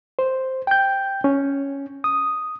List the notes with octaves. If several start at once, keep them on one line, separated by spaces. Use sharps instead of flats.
C5
G5 G6
C#4
D#6